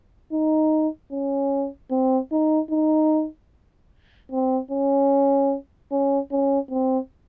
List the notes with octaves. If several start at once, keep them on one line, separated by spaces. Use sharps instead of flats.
D#4
C#4
C4
D#4
D#4
C4
C#4
C#4
C#4
C4